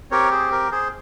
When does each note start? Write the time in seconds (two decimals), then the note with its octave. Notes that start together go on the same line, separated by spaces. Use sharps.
0.11 C4 G4 A#4 C#5
0.31 G#4 C5
0.52 A#4
0.72 G#4 C5